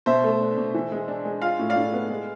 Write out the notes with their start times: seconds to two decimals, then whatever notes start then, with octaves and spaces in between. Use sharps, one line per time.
0.06 B2 C5 E5
0.24 A3
0.41 D4
0.57 B2
0.74 E3
0.92 G#3
1.08 D4
1.25 G#3
1.42 F4 F5
1.59 A2
1.69 D5 F5
1.76 A2
1.93 B3
2.10 G#3